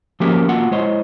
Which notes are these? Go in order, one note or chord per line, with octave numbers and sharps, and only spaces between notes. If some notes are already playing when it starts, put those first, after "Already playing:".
F3 A#3 C#4 F#4 G4 A#4
A#3 F4 F#4 F#5
G#3 E4 C5 C#5 D#5